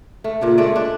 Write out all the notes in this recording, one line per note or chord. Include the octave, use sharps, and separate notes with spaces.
A3
A#2 C#3 D4
G#3 A3 D5
D4